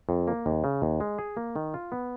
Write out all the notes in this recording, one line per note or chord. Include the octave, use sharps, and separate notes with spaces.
F2
A#3
D#2
C#3
D#2
G#3
G#4
A#3
D#3
F4
B3